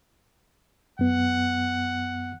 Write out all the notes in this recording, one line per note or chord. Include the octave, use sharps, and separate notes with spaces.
F#2 B3 F#5